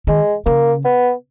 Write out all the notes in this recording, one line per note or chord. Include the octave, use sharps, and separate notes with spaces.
D#3 G#3
C#3 A#3
B3